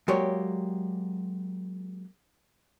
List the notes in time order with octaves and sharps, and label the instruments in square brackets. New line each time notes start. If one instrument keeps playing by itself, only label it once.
[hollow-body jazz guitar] F#3 G#3 A#3 G4 C#5 D5